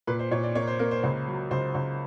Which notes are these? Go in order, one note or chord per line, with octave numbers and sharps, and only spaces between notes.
A#2 B4
C5
A#2 C#5
D5
A#3 C#5
C5
A#3 A#4
C5
C#2
F#3
C#2 C5
C#2